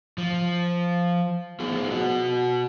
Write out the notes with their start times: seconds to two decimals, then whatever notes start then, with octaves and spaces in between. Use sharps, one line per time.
0.18 F3
1.60 B3 F4 G#4
1.91 B3 F#4